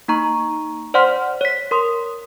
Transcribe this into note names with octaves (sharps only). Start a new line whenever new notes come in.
A#3 D#4 A#5 C#6
C5 D5 F#5 C6 F6 B6
C#5 B6
A#4 C6 D#6